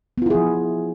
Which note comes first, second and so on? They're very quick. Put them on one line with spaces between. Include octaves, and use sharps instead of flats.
B3 F4 E4 G#4 F3